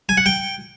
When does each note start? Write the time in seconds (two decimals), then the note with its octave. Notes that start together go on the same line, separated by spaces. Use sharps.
0.09 G#5
0.17 F#5
0.26 G5